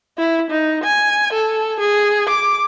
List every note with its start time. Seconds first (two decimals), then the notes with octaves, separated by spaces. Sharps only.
0.18 E4
0.50 D#4
0.84 G#5
1.33 A4
1.80 G#4
2.29 D6